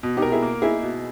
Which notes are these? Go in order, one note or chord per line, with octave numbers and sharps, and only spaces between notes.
B2
D#4 G4
A#4
E4 G#4
A#3
D#4 E4 G#4
B2